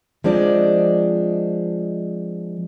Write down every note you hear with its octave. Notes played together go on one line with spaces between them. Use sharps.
F3 G#3 C4 D4 D5 D#5